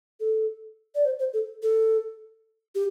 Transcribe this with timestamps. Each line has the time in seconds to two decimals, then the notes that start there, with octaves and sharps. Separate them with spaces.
0.20 A4
0.95 D5
1.05 C5
1.19 C5
1.33 A4
1.63 A4
2.75 G4